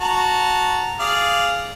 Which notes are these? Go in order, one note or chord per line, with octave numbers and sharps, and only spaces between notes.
F#4 A5 A#5
G#4 D5 F5